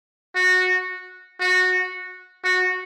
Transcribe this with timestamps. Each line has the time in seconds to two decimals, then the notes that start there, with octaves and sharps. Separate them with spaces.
0.36 F#4
1.40 F#4
2.44 F#4